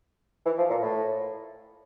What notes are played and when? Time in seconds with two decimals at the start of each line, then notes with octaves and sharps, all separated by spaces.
0.45 E3
0.58 F3
0.70 A#2
0.82 A2